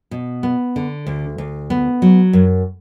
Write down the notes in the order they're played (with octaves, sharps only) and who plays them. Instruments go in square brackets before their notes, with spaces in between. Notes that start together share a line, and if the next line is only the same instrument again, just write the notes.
[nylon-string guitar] B2
B3
D3
D2
D2
B3
F#3
F#2